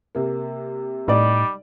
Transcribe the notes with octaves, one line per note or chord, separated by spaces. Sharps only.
C3 A#3
A2 G3 D#4 D5 D#5